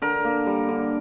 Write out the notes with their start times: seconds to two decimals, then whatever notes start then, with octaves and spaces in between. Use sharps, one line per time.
0.02 D3 A#4
0.25 A#3
0.46 G3
0.69 D3